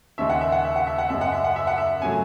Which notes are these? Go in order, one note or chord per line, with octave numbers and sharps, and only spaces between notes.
D#2 C#3 G#3 E5
F#5
E5
F#5
E5
F#5
E5
F#5
F#2 C#3 G#3 E5
F#5
E5
F#5
E5
F#5
E5
C#3 F#3 A3 G#5